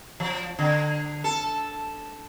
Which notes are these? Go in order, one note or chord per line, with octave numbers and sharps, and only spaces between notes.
F3
D3
A4